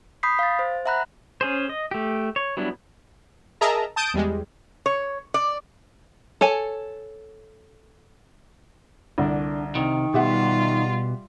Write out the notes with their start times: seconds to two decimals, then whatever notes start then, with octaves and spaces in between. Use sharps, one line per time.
0.23 B5 D#6 G6 B6 C7
0.39 F5 A6
0.59 C5
0.85 E5 F#5 A#5 B5 F#6
1.41 C#4 G#4 C5
1.69 D#5
1.91 A3 G4
2.36 C#5
2.57 F#3 G3 B3 D4 E4
3.61 G#4 A#4 D#5 E5 A5 A#5
3.96 A5 D#6 G6 D7
4.14 E2 G3 G#3
4.86 C#5
5.34 D5
6.41 A4 C#5 G#5
9.18 C2 D3 D4
9.75 C3 D#3
10.14 B2 G3 F4 G4 E5 F#5